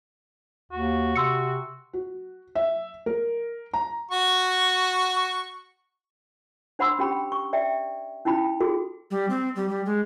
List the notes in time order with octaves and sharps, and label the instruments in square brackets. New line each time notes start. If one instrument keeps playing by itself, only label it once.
[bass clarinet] D#2 [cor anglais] F#4
[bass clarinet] C3 [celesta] C6 E6 C#7
[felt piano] F#4
E5
A#4
A#5
[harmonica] F#4 C#6
[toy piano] D4 C5 F#5 B5 C6 E6
C#4 G4 G5 B5
C#6
D5 E5 G5
C#4 D#4 E4 G5 B5
F4 F#4 G#4 A4
[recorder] G3
C4
G3
G3
G#3